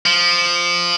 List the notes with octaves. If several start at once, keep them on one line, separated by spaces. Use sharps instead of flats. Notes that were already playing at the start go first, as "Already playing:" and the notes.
F3